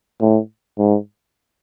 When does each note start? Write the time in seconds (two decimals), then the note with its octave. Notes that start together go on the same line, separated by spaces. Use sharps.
0.21 A2
0.78 G#2